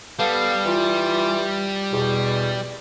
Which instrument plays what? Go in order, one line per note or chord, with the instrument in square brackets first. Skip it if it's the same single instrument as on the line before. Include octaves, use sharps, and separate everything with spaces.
[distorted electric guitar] G3 [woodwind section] B3 A4 F5
[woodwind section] E3 F4
E2 B2